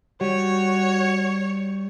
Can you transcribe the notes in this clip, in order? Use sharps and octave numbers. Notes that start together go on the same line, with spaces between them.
G3 F#4 C#5